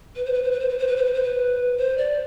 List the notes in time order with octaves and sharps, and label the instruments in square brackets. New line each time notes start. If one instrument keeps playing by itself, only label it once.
[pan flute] B4
C5
B4
C5
B4
C5
B4
C5
B4
C5
B4
C5
B4
C5
D5